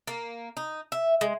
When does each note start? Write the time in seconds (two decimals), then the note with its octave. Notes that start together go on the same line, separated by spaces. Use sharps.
0.07 A#3
0.57 D#4
0.92 E5
1.21 G#3